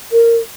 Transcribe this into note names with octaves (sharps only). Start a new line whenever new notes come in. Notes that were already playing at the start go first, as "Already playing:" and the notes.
A#4